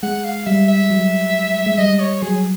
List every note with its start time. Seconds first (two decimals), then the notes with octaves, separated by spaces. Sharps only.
0.03 G#3 F#5
0.25 F5
0.46 G3 E5
0.68 E5
0.90 F#3
1.66 G#3
1.78 G3 D#5
2.00 C#5
2.22 F#3 G#4